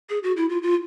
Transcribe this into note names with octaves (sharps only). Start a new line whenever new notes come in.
G#4
F#4
E4
F4
F4